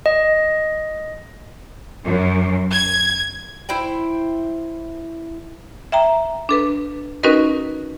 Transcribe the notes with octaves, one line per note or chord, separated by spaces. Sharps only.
D#5
F#2
G#6
E4 C5 G5
E5 G5 A#5
D4 A4 B4
C#4 D#4 F#4 A#4 B4 D#5